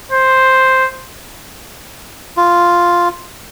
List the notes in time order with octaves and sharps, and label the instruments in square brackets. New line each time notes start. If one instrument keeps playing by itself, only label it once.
[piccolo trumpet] C5
[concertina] F4